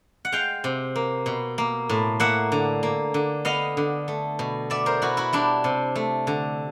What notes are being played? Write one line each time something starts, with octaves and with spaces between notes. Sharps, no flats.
F#5
G#3 F5 G5
C3
A#3
B2
A#3
A2
A#3 E5 F#5
D3
A#3
D3
B3 D#5 F5
D3
A3
B2
B3 D5 E5
A#4 C5
B2 E4 F#4
E4 F#4
G3 D4 E4
C3
A3
D3